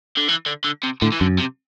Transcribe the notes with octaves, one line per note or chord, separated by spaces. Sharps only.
D3
E3
D3
D3
C3
A2 D3
E3
F#2 D3
C3